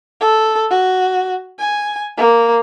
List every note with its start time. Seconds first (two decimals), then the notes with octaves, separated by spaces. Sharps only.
0.21 A4
0.71 F#4
1.59 G#5
2.18 A#3